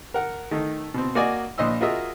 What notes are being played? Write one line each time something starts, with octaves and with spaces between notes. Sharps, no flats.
A#4 F#5
D#3 A3 D#4
B2 C4
A#3 F#4 D5 D#5 G#5
A#1 A#2 D#5 C6 E6
F4 F#4 G#4 A#4 D#5 E5